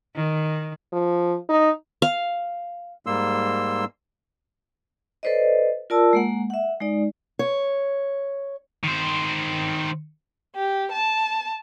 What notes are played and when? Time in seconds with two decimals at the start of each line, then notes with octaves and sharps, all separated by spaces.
0.16 D#3
0.93 F3
1.49 D#4
2.02 F5
3.06 G#2 G3 A#3 C6 E6
5.23 A4 B4 C5 D5 D#5
5.90 F4 A#4 D5 A5 E6
6.13 G#3 A#3 F#5
6.50 E5 F#5
6.80 G#3 D#4 D5
7.39 C#5
8.84 D#3 C5
10.56 G4
10.91 A5